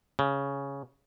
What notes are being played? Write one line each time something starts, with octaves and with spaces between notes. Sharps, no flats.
C#3